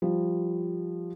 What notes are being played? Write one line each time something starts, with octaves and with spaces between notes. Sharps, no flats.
F3 G3